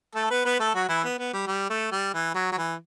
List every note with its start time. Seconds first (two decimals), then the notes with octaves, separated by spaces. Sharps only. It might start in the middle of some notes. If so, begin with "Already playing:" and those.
0.15 A3 A4
0.30 B3 B4
0.45 B3 B4
0.59 A3 A4
0.75 F#3 F#4
0.88 E3 E4
1.04 B3
1.19 B3
1.33 G3
1.47 G3
1.70 A3
1.92 G3
2.14 E3
2.34 F#3
2.52 F#3
2.58 E3